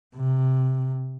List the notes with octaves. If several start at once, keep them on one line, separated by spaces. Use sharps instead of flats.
C3